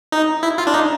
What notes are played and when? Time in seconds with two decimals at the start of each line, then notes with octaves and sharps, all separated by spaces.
0.12 D#4
0.43 E4
0.58 F4
0.67 D4
0.74 D#4